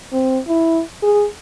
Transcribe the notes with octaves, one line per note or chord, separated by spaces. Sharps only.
C4
E4
G#4